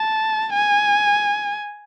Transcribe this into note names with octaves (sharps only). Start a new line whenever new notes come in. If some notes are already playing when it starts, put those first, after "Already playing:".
Already playing: A5
G#5